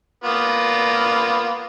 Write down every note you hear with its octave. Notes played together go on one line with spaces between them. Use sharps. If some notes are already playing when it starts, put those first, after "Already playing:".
A#3 B3 F4